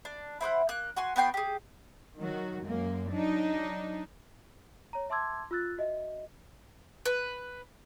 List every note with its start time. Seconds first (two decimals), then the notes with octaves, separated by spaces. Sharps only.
0.05 D4
0.41 E4 C5 D#5 F#5
0.69 A#3 F#6
0.96 F#4 G#5 C6
1.16 B3 F#4 G5 C6
1.34 G4 G#4
2.19 D#3 F#3 F#4
2.63 F#2 G#3 A#3
3.11 F#3 D4 D#4
4.93 C#5 A#5
5.10 E5 A5 C6 D6 E6 G#6
5.51 F4 E6 F#6 A6
5.78 F#4 D#5 E5
7.06 B4